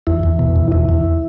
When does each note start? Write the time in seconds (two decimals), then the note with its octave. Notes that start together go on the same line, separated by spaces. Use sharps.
0.07 E2 E4
0.23 E2
0.39 B2
0.56 E2
0.72 E2 E4
0.89 E2